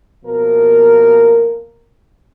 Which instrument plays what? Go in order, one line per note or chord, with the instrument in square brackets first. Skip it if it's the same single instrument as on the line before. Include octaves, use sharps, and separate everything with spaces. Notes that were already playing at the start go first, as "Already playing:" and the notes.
[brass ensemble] B2 F3 A#3 A#4